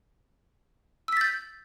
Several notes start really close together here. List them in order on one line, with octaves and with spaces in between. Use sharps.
E6 B6 A6 G6